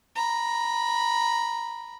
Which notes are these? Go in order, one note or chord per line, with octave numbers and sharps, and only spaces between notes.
A#5 B5